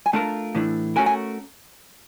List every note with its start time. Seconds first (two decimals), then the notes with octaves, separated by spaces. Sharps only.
0.06 G#5
0.13 A3 D4 F4 A#4 A5
0.55 A2 E3 A3 D4
0.96 A3 C#4 F#4 A#4 G#5
1.06 G#5